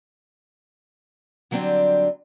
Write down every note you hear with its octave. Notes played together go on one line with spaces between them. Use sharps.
D3 F#3 G3 C4 D4